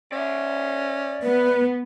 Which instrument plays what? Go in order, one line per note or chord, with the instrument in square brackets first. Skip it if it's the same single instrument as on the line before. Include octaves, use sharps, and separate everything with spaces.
[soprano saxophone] C#4 [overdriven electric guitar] D5 E5
[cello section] B3 [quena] B4